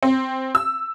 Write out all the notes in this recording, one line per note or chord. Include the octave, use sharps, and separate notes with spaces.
C4
E6